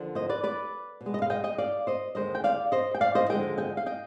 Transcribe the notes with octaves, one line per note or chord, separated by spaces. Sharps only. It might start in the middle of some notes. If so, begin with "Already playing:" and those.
Already playing: D#2 D3 F3
C5 D#5
B4 D5
B4 D5
B2
G#3
D#5
F5
D#5 G5
D#5 G5
D5 F5
C5 D#5
D#2 D3 G#3 C5 D#5
G5
D5 F5
C5 D#5
G5
D5 F5
C5 D#5
D#2 D3 F3 G#3 D#5 G5
D#5 G5
F5
D#5 G5